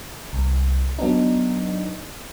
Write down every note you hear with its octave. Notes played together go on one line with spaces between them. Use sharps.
C2
F#3 B3 D4 D#4